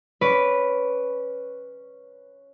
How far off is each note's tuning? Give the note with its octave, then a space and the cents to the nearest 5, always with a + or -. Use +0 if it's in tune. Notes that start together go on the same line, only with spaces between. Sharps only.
C#4 +0 B4 +0 D5 -10